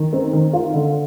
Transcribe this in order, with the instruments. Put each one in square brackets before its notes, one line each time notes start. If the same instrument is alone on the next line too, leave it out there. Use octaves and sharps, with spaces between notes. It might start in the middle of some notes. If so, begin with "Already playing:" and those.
Already playing: [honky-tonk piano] D#3
C4
D#3
F4
D3